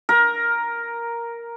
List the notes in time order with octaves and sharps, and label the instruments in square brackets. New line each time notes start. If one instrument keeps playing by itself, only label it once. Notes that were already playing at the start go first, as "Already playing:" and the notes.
[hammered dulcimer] A#4